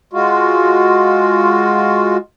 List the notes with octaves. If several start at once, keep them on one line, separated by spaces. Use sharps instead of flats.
G#3 F4 F#4